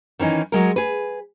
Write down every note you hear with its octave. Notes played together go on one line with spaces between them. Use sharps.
D#3 E3 C#4 D#4
F#3 G#3 A#4
G#4 B4